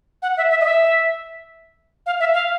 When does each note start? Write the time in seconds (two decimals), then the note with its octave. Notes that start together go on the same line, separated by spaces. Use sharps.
0.22 F#5
0.37 E5
0.50 E5
0.60 D#5
0.65 E5
2.06 F5
2.20 E5
2.34 F5